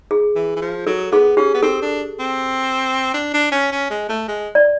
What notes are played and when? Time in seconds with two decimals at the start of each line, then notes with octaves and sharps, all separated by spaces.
0.11 G#4
0.36 E3
0.56 E3
0.62 F3
0.87 F#3 A4
1.12 B3 G#4
1.37 C#4 G4
1.54 B3
1.63 C4 A4
1.82 D4
2.20 C4
3.14 D4
3.34 D4
3.52 C#4
3.72 C#4
3.91 G#3
4.09 A3
4.28 G#3
4.55 D5